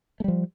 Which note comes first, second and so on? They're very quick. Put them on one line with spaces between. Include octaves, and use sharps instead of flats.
A3 G3 F3